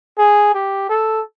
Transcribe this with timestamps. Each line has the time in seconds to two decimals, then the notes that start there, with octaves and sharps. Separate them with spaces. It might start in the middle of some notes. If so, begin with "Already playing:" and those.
0.18 G#4
0.54 G4
0.89 A4